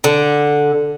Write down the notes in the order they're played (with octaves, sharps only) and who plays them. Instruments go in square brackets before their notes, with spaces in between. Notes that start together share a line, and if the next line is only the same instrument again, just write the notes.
[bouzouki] D3